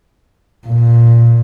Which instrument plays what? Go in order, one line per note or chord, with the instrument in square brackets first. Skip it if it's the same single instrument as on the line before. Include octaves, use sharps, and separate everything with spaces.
[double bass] A#2